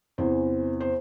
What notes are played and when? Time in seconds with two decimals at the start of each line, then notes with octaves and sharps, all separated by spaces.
0.18 E2 C3 E3 C5
0.80 C5